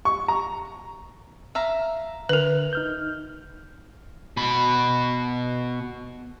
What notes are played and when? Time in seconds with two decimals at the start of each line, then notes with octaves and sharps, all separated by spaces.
0.05 C#6
0.28 A#5
1.55 E5 F5 A#5
2.29 D3 A#4 B4
2.73 D#4 F6 G6
4.37 B2 B5